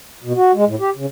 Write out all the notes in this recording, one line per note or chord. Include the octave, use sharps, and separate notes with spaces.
B2
F#4
G#3
A2
G4
C#3